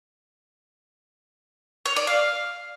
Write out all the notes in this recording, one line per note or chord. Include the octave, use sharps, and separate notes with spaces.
C#5
D5
F5